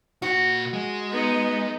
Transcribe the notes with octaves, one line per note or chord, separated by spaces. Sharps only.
A#2 F#4 F#5
G#3
B3 D#4